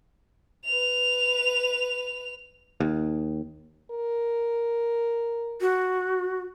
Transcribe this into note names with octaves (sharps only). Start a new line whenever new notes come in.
B4 F7
D#2
A#4
F#4